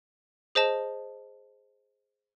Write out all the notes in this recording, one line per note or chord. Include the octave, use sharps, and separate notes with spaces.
G#4 C5 D#5 A5